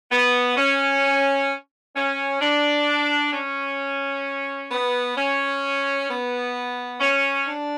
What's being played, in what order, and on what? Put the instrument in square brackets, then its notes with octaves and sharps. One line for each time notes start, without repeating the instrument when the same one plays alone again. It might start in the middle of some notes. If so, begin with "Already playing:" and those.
[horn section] B3
C#4
C#4
D4
C#4
B3
C#4
B3
C#4
D4